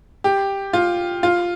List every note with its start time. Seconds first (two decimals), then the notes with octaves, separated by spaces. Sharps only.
0.24 G4
0.73 F4
1.23 F4